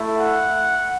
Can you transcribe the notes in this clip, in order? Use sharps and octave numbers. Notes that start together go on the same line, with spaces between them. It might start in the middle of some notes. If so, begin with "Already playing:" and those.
Already playing: A3 E4
F#5